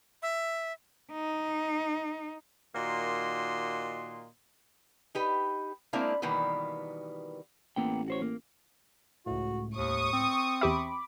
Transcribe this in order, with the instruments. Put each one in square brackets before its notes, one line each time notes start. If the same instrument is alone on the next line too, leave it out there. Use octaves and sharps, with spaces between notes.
[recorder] E5
[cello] D#4
[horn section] A#2 D#3 A#3 F#4 D#5 C6
[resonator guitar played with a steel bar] D#4 G4 B4
G#3 A#3 C4 D4 E4 F5
B2 D#3 E3 G3 A#3 B3
[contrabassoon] A1 [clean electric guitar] A#3 B3 G5
[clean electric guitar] F#4 C5 C#5
A#3
[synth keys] C#2 A2 [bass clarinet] F#4
[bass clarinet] D#2 [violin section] C#6 D#6
[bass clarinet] C4
[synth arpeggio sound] E2 G4 E5 [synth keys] B5 D6